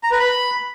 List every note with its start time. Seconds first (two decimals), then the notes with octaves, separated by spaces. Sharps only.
0.03 A#5
0.11 B4
0.19 B5